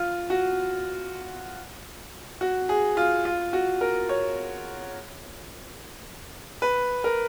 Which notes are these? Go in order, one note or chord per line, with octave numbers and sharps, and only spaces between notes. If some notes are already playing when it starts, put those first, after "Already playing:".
Already playing: F4
F#4
F#4
G#4
F4
F4
F#4
A#4
C#5
B4
A#4